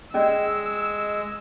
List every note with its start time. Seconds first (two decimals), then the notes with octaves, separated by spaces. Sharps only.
0.14 G#3 C#4 G#4 D5 D#5 E6